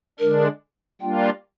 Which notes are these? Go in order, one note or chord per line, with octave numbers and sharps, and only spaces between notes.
D3 G#3 D4 A#4
G3 A#3 D4 F4 G5